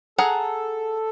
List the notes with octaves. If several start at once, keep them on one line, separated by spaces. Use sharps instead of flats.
G#4 A4 F#5 A#5